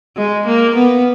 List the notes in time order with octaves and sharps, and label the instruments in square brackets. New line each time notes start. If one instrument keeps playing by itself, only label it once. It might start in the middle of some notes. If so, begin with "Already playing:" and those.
[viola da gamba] G#3
A#3
B3